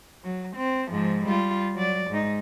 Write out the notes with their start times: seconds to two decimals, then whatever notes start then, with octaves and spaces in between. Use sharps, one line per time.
0.24 F#3
0.56 C4
0.90 G#2 F3
1.26 G3 F4
1.75 F#3 D5
2.10 G#2 D#4